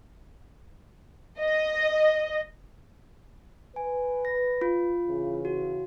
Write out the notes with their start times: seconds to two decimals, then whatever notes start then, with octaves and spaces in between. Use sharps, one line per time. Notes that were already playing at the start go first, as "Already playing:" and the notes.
1.40 D#5
3.76 B4 G#5
4.25 A#6
4.61 F4
5.06 C#3 E3
5.45 F#4